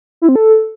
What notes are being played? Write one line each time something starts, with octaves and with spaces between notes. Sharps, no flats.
E4
C4
A4